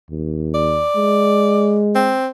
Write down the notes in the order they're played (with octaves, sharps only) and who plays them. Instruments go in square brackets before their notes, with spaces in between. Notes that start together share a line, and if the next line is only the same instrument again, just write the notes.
[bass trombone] D#2
[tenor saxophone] D5
[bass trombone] G#3
[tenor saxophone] C4